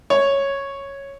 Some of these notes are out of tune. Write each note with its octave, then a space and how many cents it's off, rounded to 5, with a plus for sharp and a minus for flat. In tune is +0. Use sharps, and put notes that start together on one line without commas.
C#5 -5